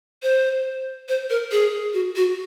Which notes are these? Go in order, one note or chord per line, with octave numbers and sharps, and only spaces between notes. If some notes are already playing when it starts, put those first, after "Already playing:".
C5
C5
A#4
G#4
F#4
F#4